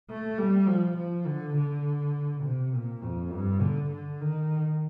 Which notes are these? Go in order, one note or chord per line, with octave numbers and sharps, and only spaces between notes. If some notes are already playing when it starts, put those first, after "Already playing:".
A3
G3
F3
F3
D3
D3
C3
A#2
F2
G2
D3
D3
D#3